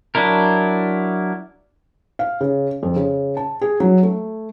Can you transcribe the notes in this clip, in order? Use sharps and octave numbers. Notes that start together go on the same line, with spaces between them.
F#3 D4 E4 A#4
F5
C#3
F2
C#3
A5
G#4
F#3
A3